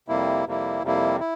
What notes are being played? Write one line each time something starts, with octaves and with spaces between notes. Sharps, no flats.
F2 C3 G3 A#3 E4
F2 C3 G3 A#3 E4
F2 C3 G3 A#3 E4
E4